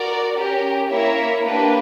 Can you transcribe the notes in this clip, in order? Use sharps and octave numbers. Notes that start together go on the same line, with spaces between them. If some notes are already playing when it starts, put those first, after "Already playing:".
Already playing: F#4 A#4 D5
C#4 G4 A#4
A#3 E4 A#4 C#5 E5
A#3 D4 G4 B4